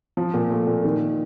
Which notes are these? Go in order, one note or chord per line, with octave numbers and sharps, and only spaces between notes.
F3
A#2
A3
A#2
D#3